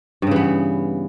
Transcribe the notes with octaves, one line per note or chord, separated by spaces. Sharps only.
G2 C#3 E3 B3